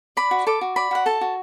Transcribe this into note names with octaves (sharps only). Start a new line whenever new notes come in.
D5 B5
F#4
A4 D6
F#4
D5 B5
F#4 F#5
A4 A5
F#4